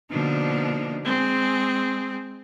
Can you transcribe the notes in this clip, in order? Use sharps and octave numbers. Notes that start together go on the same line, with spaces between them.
B2 D3 F3 A#3 D4 D#4
G#3 C4 G#4